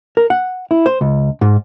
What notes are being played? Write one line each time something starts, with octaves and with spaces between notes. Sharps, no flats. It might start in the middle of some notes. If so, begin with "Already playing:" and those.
A#4
F#5
E4
C5
C#2
G#2